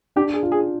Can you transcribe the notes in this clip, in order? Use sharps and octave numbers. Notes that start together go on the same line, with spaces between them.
D4 G4
G#4
F4
G#4